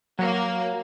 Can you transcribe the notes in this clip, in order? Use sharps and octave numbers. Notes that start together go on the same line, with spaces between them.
F#3 A#3